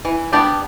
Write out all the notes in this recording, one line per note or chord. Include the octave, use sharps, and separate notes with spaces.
E3
B3 D4 G4 D5